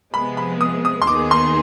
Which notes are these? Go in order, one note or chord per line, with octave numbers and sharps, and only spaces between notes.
C3 F3 G#3 B3 B5
B5
D#6
D#6
C6
D#2 D#3 B3 D#4 G#4 D6
C6